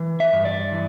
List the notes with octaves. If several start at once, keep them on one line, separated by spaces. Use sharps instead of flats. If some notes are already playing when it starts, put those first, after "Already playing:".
Already playing: E3
E5
G2
D5
E3